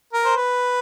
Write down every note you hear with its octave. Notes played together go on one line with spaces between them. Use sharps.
A#4
C5
B4